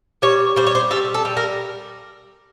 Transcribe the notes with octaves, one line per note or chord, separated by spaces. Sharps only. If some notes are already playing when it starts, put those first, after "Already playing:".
G3 C#5
G3 C5
C#5
C5
G3 A4
A4
G3
A#4